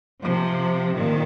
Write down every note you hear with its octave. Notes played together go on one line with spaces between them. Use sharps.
C3 F3
A#2 D#3